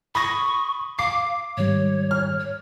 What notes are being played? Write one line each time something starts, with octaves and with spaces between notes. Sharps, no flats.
B5 C#6 D#6 A#6
F5 D6 C7
G#2 D#3 G3 C#5
F6
C#5